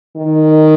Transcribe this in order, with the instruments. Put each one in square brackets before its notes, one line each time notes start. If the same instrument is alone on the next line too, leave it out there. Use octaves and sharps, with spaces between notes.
[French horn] D#3